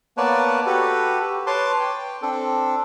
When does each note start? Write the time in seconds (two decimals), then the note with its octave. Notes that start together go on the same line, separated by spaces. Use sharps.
0.17 A#3 B3 B4 C#5 D5 A5
0.66 F#4 G4 A4 B4
1.47 B4 C#5 A5 C6 D6
1.80 G5
2.22 C4 D4 A4